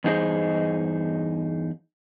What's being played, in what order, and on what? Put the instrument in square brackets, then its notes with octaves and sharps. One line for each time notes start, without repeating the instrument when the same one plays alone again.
[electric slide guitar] E2 G2 D#4 G#4 C5 D#5